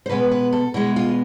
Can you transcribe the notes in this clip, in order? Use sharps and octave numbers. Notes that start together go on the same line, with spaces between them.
C5
B2 G#3 B3 B4
B4
A4
B2 G#3 B3 E4
F4